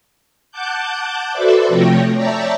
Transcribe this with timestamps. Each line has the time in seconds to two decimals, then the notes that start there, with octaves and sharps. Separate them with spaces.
0.51 F#5 A5 D6 F#6 G6
1.31 F#4 A4 B4 C5 D5 E5
1.68 C3 F3 A3 C#5 G5 A#6
2.16 C#5 D5 E5 G5 A5 A#5